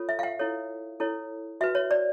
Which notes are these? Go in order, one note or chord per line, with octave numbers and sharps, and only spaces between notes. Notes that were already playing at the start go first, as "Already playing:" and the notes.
Already playing: F4 A4 C#5
E5
F5
F#5
E4 A4 C#5
E4 A4 C#5
F#4 B4 E5
C#5
D5